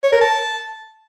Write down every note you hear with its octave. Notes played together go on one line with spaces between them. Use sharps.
C#5
A#4
A5